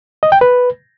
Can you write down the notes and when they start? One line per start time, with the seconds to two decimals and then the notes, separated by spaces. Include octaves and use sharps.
0.23 D#5
0.32 G5
0.41 B4